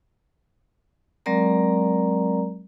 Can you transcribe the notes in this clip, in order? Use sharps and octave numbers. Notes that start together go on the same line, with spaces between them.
F#3 G#3 C4 A#4 D5 A#5